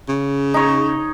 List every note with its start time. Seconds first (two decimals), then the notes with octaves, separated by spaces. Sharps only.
0.09 C#3
0.54 D#4 C#5